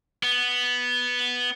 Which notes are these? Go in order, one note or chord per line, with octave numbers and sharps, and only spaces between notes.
B3